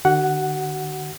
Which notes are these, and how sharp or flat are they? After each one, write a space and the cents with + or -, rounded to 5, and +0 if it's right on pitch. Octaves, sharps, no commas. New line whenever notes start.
D3 +40 F#4 +40 F#5 +0